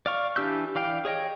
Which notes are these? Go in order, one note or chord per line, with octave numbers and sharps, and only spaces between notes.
D5 F5 C#6
E3 D4 G4 E6 G6
E3 D5 F5 G5
G#4 C#5 D#5 G5